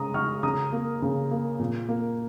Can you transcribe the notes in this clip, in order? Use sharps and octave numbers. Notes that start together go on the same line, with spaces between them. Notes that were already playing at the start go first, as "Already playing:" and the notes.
Already playing: C#3 G#3 A#5 D#6
G#3 C#6 F6
C#3 A#5 D#6
A#3
C#3
A#3
A#2
A#3